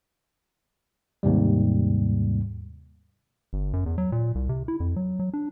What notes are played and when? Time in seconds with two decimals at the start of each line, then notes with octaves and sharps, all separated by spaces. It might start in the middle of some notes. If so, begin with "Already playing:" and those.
1.23 D#2 G#2 C3 G3
3.53 G1
3.73 F#2
3.86 E2
3.98 F#3
4.12 A#2
4.35 C2
4.49 C3
4.68 E4
4.80 F2
4.96 F#3
5.19 F#3
5.33 D4